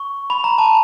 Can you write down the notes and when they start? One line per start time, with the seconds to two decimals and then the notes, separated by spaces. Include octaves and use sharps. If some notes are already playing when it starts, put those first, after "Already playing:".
Already playing: C#6
0.30 B5
0.44 A#5
0.58 A5